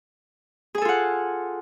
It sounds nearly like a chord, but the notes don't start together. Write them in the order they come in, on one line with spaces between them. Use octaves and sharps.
G#4 G#5 A4 F4 F#5